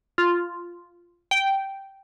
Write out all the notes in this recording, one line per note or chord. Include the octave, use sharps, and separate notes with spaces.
F4
G5